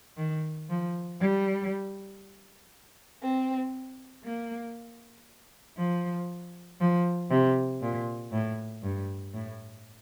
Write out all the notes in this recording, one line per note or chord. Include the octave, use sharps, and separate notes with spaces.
D#3
F3
G3
C4
A#3
F3
F3
C3
A#2
A2
G2
A2